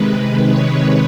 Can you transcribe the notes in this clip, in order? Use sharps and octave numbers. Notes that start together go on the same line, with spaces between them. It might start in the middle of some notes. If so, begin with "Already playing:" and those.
Already playing: C3 D#3 G#3 B4
C#5